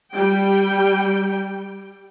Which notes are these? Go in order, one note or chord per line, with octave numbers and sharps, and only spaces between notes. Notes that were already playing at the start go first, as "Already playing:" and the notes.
G3 G5